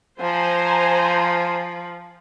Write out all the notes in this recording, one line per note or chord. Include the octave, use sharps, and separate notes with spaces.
F3 C5 G#5 A#5